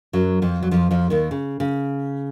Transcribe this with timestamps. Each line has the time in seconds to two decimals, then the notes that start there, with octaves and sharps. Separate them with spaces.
0.13 F#2 F#3
0.42 F2 F3
0.63 F#3
0.71 F2 F3
0.91 F2 F3
1.10 D#2 D#3
1.31 C#3
1.60 C#3